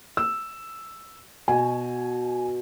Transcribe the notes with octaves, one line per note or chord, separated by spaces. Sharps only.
E6
B2 G#5